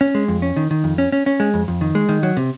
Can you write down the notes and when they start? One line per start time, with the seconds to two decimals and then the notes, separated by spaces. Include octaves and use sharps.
0.01 C#4
0.15 G#3
0.28 F2
0.42 C#4
0.57 D#3
0.71 D#3
0.84 F2
0.98 C#4
1.12 C#4
1.26 C#4
1.40 G#3
1.54 F2
1.68 F2
1.81 D#3
1.95 G#3
2.09 D#3
2.23 F#3
2.37 C3